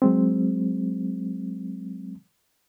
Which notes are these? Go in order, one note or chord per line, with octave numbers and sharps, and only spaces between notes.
F#3 G#3 C4